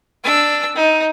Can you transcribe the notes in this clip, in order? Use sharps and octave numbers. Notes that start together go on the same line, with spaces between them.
D4 E6
D#4